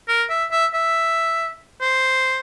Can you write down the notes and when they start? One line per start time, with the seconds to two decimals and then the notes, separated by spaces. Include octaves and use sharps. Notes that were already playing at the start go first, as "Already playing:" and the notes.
0.08 A#4
0.30 E5
0.51 E5
0.74 E5
1.81 C5